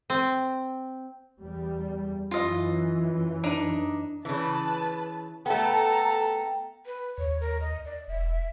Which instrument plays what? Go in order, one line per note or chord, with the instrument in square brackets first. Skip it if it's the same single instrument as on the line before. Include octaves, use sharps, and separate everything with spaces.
[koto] C4
[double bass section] E2 G3
[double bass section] F#2 E3 [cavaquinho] F4 D#5
[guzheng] D4 [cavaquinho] D#4
[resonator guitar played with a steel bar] C#3 E3 [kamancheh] B4 A5
[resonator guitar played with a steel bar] A3 B3 [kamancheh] A4 A#5 [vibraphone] G5
[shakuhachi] B4
[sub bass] D#2 [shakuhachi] C#5
[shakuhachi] A#4
D#5
D5
[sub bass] E1 [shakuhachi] E5